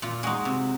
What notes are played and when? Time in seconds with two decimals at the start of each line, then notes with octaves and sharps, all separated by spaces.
0.02 A#2 F4
0.23 G#3 D#4 F#4
0.45 C3